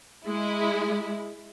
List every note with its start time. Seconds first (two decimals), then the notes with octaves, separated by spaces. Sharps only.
0.24 G#3 E4